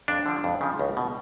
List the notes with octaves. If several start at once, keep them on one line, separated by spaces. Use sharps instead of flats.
F2 D4
D3 F3
F2
C#3 F3
C#2
B2